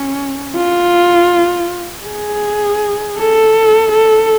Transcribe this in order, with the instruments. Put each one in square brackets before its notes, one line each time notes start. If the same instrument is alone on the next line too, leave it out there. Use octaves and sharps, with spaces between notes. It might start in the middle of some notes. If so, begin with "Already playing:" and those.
Already playing: [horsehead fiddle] C#4
F4
G#4
A4
A4